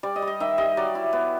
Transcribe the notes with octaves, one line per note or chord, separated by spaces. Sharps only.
G3 D5
D#5
G3
D#5
D#3 E5
G3 D#5
F#3 D5
E4
B3